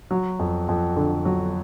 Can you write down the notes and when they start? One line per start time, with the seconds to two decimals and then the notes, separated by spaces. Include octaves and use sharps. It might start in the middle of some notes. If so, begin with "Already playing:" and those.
0.11 F#3
0.39 F2
0.69 F2
0.96 D3
1.25 F#3